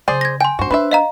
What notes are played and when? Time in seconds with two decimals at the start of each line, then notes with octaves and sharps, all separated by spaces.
0.08 C#3 F#3 G#4 C5 D5
0.21 G#6 A#6
0.40 G5 G#5 C6
0.59 G2 F#4 C5
0.71 D4 B4 C5 E5
0.91 D#5 F5 A#5